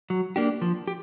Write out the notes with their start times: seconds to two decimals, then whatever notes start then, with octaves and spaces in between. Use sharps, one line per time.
0.10 F#3
0.36 A#3 D4 G4
0.62 F3
0.87 G4